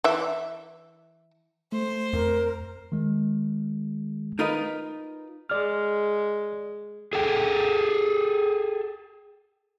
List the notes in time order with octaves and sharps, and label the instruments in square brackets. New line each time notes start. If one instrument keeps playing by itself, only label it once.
[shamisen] E3 E5
[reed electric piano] A3 [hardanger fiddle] C5
[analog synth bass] F2 [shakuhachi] A#4
[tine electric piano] D#3 G#3
[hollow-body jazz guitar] D#4 F4 A#4 B4 D#5
[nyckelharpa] G#3 [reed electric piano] D5 F6
[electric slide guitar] G#4 A4 G5